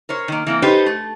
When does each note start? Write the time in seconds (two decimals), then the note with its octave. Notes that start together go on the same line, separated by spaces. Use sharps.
0.09 A#4 C5 C#5
0.28 D#3 A#3
0.47 E3 A#3 C4
0.62 D#4 G4 A4 B4 C5
0.86 A3